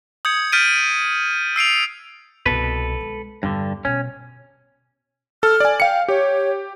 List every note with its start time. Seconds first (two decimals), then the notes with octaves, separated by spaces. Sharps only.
0.25 D#6 G6 G#6 C#7
0.52 F6 G6 A6 B6 D7 D#7
1.56 E6 C7 D7 F7
2.46 C2 B2 A4 B4
3.01 G#3
3.43 E2 G2 D3
3.85 B2 C#4
5.43 A4 F6
5.60 D5 G#5
5.80 F5 G5 C#7
6.08 G4 C#5